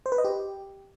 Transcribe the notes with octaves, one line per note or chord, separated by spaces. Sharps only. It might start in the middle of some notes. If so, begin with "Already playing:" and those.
C5
B4
D#5
G4